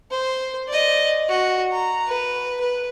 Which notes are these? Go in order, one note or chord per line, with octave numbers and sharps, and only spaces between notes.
C5
D5 D#5
F#4
A#5
B4
B4